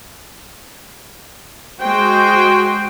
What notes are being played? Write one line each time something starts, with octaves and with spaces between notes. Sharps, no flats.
G#3 F#4 C5 G5